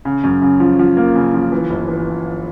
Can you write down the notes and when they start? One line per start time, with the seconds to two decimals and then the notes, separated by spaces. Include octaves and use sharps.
0.05 C#3
0.24 F#2
0.42 C#3
0.60 F3
0.79 F3
0.97 A#3
1.15 C#3
1.34 F3
1.52 E3
1.70 G1
1.88 E3